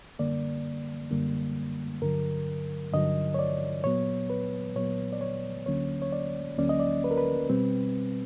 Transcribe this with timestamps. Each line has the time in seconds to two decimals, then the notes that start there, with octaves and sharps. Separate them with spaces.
0.19 F#2 D3 G3 A#3 D5
1.11 F#2 D3 G3 A#3
2.02 G2 D3 F#3 A#4
2.93 G2 D3 F#3 D#5
3.34 C#5
3.39 D5
3.84 A#2 F#3 B3 C#5
4.30 B4
4.75 A#2 F#3 B3 C#5
5.12 D5
5.21 C#5
5.66 D2 D3 F#3 A#3 C#4 C#5
6.02 C#5
6.13 D5
6.57 D2 D3 F#3 A#3 C#4 D5
6.69 D#5
6.80 D5
7.04 B4
7.11 A#4
7.18 B4
7.50 B2 G3 C4